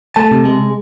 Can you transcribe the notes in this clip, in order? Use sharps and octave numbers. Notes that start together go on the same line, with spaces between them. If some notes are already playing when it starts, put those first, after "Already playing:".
A3 A5
C3
G#3